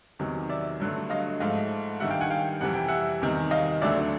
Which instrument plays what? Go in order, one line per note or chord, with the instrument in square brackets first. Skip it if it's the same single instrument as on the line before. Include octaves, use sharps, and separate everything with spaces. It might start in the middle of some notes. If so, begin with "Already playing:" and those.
[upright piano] E2 C3 D#3 F#3
D5 E5
G2 D3 F#3 A3
D#5 F5
G#2 F3 A3 D#5 F5
G2 D#3 G3 E5 F#5
F5 G5
F#5 G#5
F5 G5
F2 C3 E3 G3 F#5
G5
E5 F#5
E2 C3 D#3 G3
D#5 F5
D2 D3 F#3 A3 D5 E5